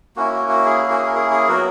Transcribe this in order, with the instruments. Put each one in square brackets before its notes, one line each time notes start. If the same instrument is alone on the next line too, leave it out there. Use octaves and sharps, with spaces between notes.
[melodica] A#3 C#4 E4 F#4
F#4
F#4
G#4
G#4
F#4
G#4
A#4
G#4
G#4
F#3 B3 F#4 A#4